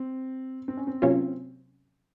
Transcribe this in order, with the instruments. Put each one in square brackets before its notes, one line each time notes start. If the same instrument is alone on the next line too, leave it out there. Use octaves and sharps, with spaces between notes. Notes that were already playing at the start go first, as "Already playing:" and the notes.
Already playing: [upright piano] C4
C4
C#4
C4
[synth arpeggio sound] C3 F#3 A#3 C#4 F4